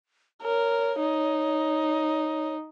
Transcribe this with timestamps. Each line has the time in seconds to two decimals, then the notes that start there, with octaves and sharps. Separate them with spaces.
0.42 A#4 C#5
1.00 D#4